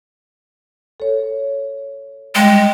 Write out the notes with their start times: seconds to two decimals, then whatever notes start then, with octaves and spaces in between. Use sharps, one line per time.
1.00 A4 C#5
2.35 G3 G#3 F5 G5